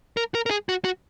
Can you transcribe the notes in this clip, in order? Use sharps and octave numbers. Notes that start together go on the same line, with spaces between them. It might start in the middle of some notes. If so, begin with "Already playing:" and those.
A#4
A#4
A#4
G#4
F#4
F#4